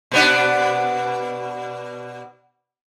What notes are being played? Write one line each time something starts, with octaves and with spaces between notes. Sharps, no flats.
B2 B3 D4